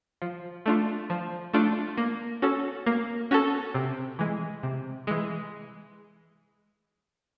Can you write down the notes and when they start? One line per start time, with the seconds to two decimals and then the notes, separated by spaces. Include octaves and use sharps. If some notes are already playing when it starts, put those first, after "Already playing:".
0.22 F3
0.66 A3 D4 F4
1.10 F3
1.53 A3 D4 F4
1.97 A#3
2.42 C#4 F#4 A4
2.86 A#3
3.31 C#4 F#4 A4
3.74 C3
4.19 E3 G#3
4.63 C3
5.07 E3 G#3